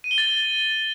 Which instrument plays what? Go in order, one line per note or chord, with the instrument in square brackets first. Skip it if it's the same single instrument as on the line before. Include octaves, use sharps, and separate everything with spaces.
[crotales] D#7
G7
A6